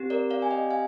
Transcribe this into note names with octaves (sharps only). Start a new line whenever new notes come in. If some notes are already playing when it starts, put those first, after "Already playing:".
Already playing: C4 G4
A#4 D5
D5 F5
G#5
D#5 G5
F5 G#5